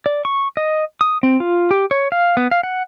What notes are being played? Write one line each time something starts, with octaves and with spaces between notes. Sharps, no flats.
D5
C#6
D#5
D#6
C4
F4
G4
C#5
F5
B3
F5
F#5